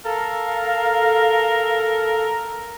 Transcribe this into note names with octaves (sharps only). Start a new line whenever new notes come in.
A4 A#4 F5